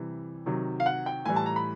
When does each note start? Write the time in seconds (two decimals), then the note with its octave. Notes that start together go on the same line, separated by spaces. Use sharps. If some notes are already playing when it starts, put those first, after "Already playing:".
Already playing: C3 E3 G3
0.46 C3 D#3 F#3
0.80 F5
0.86 F#5
1.06 G5
1.25 A2 E3 G3 G#5
1.36 A5
1.46 A#5
1.56 B5